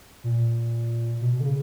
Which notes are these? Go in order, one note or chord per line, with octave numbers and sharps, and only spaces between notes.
A#2
B2
B2
D3
C#3